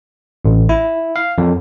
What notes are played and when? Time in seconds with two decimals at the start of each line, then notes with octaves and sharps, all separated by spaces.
0.45 A1
0.69 E4
1.16 F5
1.38 F2